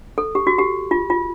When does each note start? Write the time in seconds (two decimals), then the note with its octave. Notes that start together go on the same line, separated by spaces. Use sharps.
0.18 A4
0.35 G4
0.47 F#4
0.58 G4
0.91 F4
1.10 F4